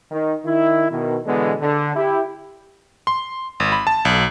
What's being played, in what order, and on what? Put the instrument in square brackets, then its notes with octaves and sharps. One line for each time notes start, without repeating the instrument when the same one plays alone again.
[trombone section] D#3
D#3 E4
B2 D#3
B2 D3 E3 G#3 B3
D3
E4 G4
[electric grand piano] C6
G#1
B5
A5
B1